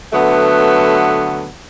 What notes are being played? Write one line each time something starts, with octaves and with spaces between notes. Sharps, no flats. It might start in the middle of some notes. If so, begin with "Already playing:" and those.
D3 F#3 A3 B3